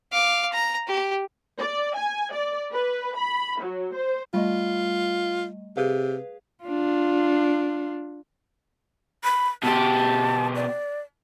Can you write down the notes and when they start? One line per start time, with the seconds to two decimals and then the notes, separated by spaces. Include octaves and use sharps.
0.12 F5 D6
0.52 A#5
0.88 G4
1.59 D5
1.96 G#5
2.33 D5
2.72 B4
3.16 B5
3.61 F#3
3.94 C5
4.34 G3 A3 F4 D#5
5.77 C3 G#4 B4 F5
6.64 D4 F4
9.24 B5
9.63 B2 G4 A5
10.56 D5